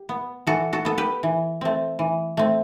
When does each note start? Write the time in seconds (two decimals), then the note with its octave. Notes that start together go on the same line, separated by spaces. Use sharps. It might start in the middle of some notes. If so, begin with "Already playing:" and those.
Already playing: G4
0.09 B3
0.47 E3 F#4 A4
0.73 F#4 A4
0.85 B3 A4
0.98 G4 B4
1.23 E3
1.61 A3 C4
1.99 E3
2.37 A3 C4